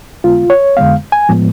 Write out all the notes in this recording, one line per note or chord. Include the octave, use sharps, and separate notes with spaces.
F2 D3 G#3 B3 F4
C#5
F2 D3 G#3 B3 F5
G#5
A2 F3 G#3 B3